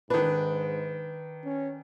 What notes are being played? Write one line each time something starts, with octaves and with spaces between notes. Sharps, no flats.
G#2 D#3 D4 B4
C#4